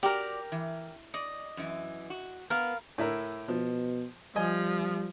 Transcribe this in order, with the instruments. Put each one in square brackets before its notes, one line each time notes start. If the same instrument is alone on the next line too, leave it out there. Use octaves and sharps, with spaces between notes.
[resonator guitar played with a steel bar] F#4 D5 [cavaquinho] G4 A#4
[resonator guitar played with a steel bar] E3
[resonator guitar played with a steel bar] D5 [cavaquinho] D#5
[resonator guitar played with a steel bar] F#2 E3
F#4
[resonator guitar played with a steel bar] B3 [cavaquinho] A#4 F5
[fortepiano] A2 E4 A#4
[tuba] B2 [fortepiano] F3
[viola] F3 [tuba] G3 [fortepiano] D#5 G#5